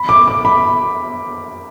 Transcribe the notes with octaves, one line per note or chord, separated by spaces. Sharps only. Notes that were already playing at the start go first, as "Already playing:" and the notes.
Already playing: B5
D6
D6
B5